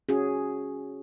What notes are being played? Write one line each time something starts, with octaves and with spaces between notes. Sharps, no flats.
C#4 F#4 G#4